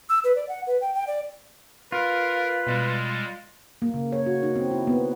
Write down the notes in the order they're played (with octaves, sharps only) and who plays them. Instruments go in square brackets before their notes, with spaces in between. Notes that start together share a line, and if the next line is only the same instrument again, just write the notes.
[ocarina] E6
B4
D5
F#5
B4
G5
G5
D5
[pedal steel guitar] F4 [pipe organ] A#4 [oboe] B4
[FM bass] B2 [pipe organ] G3 G#3
[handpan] A#3
C#3
C#5
F#4
D#4
C4
E4
B3